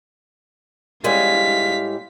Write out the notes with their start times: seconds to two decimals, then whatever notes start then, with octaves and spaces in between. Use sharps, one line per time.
1.04 A2 G3 G#3 F5 B6